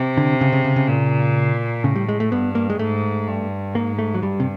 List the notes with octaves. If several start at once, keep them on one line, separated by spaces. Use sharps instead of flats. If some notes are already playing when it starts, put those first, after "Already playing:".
Already playing: C3
D3
C#3
C#3
C#3
C#3
A#2
A2 C#3
G3
G#3
A3
G2 B3
A#3
G#3
G#2 A3
G2
G#2 A#3
A3
F#3
G2 G3
C3